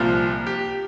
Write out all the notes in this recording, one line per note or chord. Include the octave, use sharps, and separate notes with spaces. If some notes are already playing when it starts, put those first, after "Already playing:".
Already playing: C2 A#2 F3 F4
G4